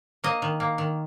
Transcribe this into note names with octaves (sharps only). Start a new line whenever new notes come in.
A#3 D#5
D#3
A#3
D#3